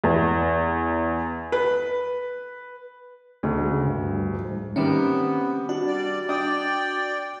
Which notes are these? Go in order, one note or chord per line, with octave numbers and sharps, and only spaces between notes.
E2
B4
D2 G#3
C#3
G2
F3
G#2
C3 D#3 G3 A#3 B3 C#4
D4 F#4
G3 D5
D4 D5 G5 D#6